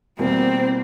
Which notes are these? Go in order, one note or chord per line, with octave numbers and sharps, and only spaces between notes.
E2 B2 G3 A#3 C4